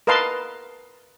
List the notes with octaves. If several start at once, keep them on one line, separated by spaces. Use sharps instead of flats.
A#4 B4 D#5 F5 A5 C6